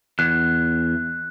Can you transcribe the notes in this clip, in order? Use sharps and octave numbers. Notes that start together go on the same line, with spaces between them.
E2 F#6